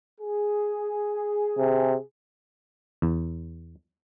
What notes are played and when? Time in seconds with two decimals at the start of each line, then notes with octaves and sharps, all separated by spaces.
0.21 G#4
1.58 C3
3.02 E2